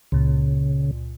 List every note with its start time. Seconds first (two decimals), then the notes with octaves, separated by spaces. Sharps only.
0.12 C#2 A#2 C#3